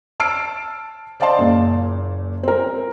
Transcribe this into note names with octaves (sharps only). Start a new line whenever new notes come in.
A5 E6 F6 C7 D7
C5 D5 D#5 F5 A5 C6
F#1 A#2
C4 A#4